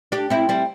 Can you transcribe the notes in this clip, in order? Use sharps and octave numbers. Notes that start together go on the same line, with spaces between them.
D4 G4
C4 E4
G3 C4